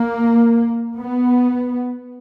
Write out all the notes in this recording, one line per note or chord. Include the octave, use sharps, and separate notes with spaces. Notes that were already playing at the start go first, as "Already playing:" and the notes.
Already playing: A#3
B3